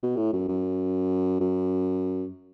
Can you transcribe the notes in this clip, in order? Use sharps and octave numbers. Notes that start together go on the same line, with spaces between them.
B2
A2
F#2
F#2
F#2